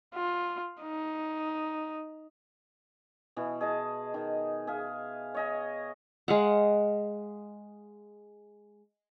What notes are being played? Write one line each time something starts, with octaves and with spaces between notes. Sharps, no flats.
F4
D#4
B2 E3
G#4 D#5 A5
D#3
G#4 E5 F5
C#5 D#5 G#5
G#3 F5 F#5